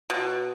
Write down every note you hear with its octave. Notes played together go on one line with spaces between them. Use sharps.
B2